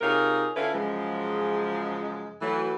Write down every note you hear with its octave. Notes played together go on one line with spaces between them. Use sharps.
C3 D#4 F4 G#4 A#4 C#5
D3 C#4 E4 F4 A4 B4
F#2 C#3 F3 G#3
E3 F#3 A3